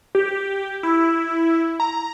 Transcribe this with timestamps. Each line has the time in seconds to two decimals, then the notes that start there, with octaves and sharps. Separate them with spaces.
0.15 G4
0.83 E4
1.80 A#5